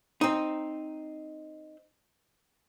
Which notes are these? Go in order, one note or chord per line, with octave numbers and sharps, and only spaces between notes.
C4 D#4